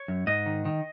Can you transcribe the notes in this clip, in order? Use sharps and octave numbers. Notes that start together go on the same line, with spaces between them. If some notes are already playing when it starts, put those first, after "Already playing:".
Already playing: C#5
F#2
G#2 D#5
D#3
D#3